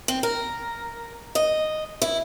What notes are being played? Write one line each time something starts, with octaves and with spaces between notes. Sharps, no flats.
C4
A#4
D#5
E4